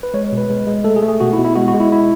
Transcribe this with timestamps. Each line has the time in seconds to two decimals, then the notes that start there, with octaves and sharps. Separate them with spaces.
0.03 B4
0.14 G#3 C#5
0.32 B2
0.37 B4
0.50 G#3
0.67 G#3
0.84 A3 A4
0.96 G#4
1.02 A3
1.08 G#4
1.20 B2 F#4
1.33 E4
1.38 B2
1.45 E4
1.56 G#3 F#4
1.68 F#4
1.74 G#3
1.80 E4
1.92 E4